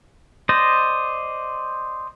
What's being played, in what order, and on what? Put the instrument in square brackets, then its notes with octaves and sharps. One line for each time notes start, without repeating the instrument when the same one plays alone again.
[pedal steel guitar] C5 D5 D#5